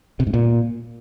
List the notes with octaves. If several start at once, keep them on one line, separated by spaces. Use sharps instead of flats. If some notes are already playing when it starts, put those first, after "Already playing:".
C3
G#2
A#2